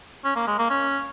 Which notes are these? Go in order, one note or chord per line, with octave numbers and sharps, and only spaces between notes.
C#4
A#3
G#3
A#3
C#4